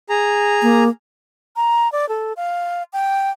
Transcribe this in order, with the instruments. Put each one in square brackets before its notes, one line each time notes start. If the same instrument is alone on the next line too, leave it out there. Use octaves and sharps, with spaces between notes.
[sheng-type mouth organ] G#4 A#5
[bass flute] A#3
[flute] A#5
D5
A4
F5
G5